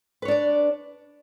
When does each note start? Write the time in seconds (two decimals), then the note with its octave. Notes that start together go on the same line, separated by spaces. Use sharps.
0.22 B4
0.25 C#5
0.28 D4
0.31 D5